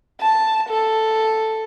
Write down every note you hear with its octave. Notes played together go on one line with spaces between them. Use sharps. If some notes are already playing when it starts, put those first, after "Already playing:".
A5
A4